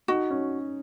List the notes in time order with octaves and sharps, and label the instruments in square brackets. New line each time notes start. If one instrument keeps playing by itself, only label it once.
[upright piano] D#4 [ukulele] F#4
[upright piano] C#4